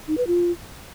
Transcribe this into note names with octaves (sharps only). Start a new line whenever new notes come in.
D#4
B4
F4